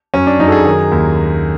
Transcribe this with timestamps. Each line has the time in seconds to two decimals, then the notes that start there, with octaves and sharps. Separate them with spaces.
0.14 F#2 C#4
0.27 D4
0.39 F#2 D#4
0.48 A4
0.52 G#4
0.65 D#3
0.91 D#2